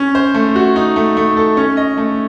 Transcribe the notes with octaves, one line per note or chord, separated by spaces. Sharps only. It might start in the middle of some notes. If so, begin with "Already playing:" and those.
Already playing: C#4
C5
A3
F#4
D#4
A3
A3
A4
C#4
D#5
A3